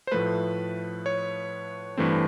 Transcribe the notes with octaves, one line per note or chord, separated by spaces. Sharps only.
C5
A2 F3 A3 B4
C#5
G2 E3 A3 C4